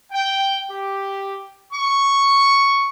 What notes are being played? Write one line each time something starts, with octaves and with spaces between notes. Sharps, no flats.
G5
G4
C#6